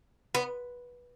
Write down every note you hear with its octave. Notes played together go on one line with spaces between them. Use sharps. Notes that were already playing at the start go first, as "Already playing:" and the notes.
B3